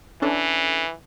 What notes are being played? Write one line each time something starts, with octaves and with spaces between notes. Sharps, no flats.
E3 C#4 D4 A4